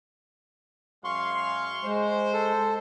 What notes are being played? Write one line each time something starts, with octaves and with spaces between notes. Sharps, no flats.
F#2 G#3 F5 C6 C#6
G#3 C5
A4